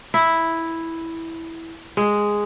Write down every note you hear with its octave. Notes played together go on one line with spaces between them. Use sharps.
E4
G#3